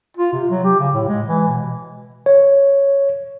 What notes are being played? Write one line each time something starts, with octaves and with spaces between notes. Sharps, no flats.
F4
C3
F#3
G4
C#3
A2
G#3
E3
B2
C#5